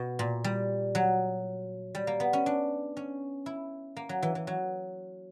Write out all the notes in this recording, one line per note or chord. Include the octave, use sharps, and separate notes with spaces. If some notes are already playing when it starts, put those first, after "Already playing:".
Already playing: B2
A#2
G3
F#3
G3
A#3
B3
C#4
D4
C#4
E4
A#3
F#3
E3
E3
F#3